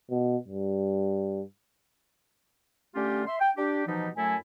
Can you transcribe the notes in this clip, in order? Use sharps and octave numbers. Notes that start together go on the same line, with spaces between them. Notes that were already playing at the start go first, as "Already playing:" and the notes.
B2
G2
D3 A3 C#4 F4 G4
E5 C6
G5
D4 G4
B2 E3 F3 G3 D#4
F#2 F#3 A3 E4 A4 G#5